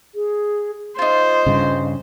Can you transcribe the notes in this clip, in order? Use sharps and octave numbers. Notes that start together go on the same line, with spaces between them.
G#4
D#4 F4 C5 D#5
G2 C#3